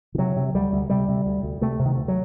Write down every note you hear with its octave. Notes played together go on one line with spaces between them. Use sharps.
D#3
C3 F#3
C3
D2 G3
D2
C3 G3
C3
D2
D2
C3 A3
C3
D#3
D2
F#3